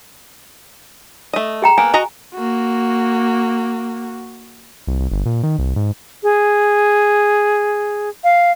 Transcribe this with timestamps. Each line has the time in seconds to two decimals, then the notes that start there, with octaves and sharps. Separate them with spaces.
1.33 A3 D#5
1.62 G#4 G5 A#5
1.78 A#3 B3 G#5
1.94 F#4 D#5 A#5
2.35 A#3 F#4
4.87 C2
5.00 C2
5.12 G1
5.26 A#2
5.43 D#3
5.59 C2
5.76 G#2
6.23 G#4
8.24 F5